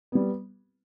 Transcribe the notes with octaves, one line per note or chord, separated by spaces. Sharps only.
G3 B3